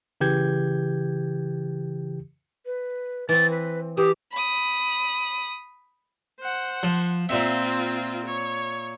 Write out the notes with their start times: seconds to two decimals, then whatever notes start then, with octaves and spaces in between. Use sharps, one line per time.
0.21 C#3 E3 G4 G6 G#6
2.66 B4
3.29 E3 C4 A6
3.51 B4
3.97 E3 G4 D#6
4.32 B5 D#6
6.40 C5 F#5
6.83 F3
7.29 A#2 C4 F4 E5
8.25 C#5